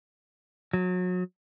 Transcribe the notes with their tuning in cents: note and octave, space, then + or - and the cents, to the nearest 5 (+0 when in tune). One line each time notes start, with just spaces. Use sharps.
F#3 -30